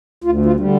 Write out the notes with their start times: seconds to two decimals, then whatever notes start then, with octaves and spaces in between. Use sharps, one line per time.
0.24 D2 F4
0.46 F4
0.56 D3 G3